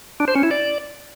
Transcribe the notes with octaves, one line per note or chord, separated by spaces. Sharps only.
D4
C5
C#4
E4
D5